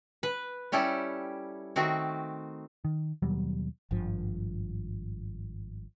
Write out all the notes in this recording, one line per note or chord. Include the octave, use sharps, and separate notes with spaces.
B4
G3 C#4 E4 G4 A4
D#3 A3 C4 F#4
D#3
D#2 B2 F#3 G3
G#1 G2 F3